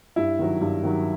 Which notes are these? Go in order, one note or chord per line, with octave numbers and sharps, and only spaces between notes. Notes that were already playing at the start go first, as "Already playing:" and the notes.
G2 E4
D#3 F#3
G2
D#3 F#3